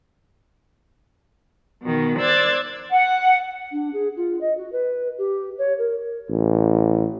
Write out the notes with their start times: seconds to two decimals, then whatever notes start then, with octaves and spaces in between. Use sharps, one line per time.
1.83 B2 D#3
2.18 C5 D5 E6 F#6 G#6 A6
2.91 F#5
3.72 D4
3.93 G#4
4.16 F4
4.41 D#5
4.57 F#4
4.72 B4
5.18 G4
5.58 C#5
5.78 A#4
6.30 A1